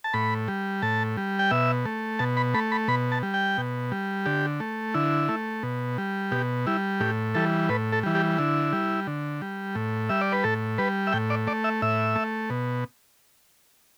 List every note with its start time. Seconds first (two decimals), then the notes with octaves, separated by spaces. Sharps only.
0.04 A5
0.14 A2 B5
0.48 G3
0.82 A2 A5
1.17 G3
1.39 G5
1.51 B2 E5
1.86 A3
2.19 B2 A5
2.37 B5
2.54 A3 B5
2.72 B5
2.88 B2 B5
3.12 A5
3.23 G3
3.34 G5
3.58 B2
3.92 G3
4.26 D3 G4
4.60 A3
4.94 D3 E4
5.29 A3
5.63 B2
5.98 G3
6.32 B2 G4
6.66 G3 E4
7.00 A2 G4
7.35 E3 G3 A4
7.69 A2 B4
7.93 A4
8.03 E3 G3
8.15 G4
8.38 D3 E4
8.73 G3
9.07 D3
9.42 G3
9.75 A2
10.09 G3 E5
10.21 D5
10.32 B4
10.44 A2 A4
10.78 G3 B4
11.07 E5
11.13 A2 G5
11.30 D5
11.47 A3 D5
11.64 E5
11.82 A2 E5
12.16 A3
12.50 B2